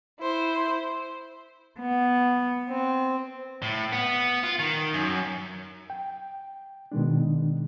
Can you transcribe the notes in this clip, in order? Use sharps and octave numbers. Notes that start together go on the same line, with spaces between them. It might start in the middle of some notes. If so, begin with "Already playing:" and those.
E4 C5
B3
C4
A2
B3
F4
D#3
F#2
G5
B2 D#3 G#3 D4